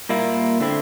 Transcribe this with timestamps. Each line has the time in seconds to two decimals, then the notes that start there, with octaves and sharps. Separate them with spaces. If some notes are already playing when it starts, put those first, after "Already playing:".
0.09 A#2 G3 A#3 E4
0.60 D3 A3 C4 E4